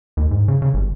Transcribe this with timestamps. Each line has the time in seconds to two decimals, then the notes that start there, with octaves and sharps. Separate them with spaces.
0.17 D#2
0.31 G#2
0.48 C#3
0.62 C#3
0.74 G1